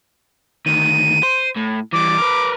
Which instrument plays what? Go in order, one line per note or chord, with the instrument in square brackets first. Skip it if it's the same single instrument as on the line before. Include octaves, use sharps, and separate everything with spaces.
[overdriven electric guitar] D2 D#3 [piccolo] D#7
[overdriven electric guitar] C5
A2
[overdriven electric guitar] E3 G3 [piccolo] D6
[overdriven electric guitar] A#4 B4